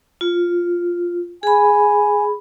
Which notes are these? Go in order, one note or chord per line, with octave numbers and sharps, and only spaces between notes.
F4
G#4 G#5 B5